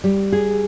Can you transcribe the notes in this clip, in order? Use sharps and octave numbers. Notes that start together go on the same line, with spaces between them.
G3
G#4